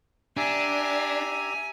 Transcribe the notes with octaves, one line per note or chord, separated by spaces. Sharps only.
D4 G4 E5 G#5 A#5